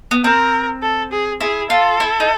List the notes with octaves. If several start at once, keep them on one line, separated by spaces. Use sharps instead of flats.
B3
C4 A#4
A4
G#4
E4 G#4
F4 A4
E4
D#4